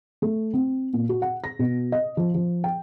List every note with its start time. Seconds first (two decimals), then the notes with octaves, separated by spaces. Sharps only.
0.22 A3
0.53 C4
0.94 A#2
1.09 F#4
1.22 F#5
1.44 A#6
1.59 B2
1.92 D#5
2.17 F3
2.34 F3
2.64 G5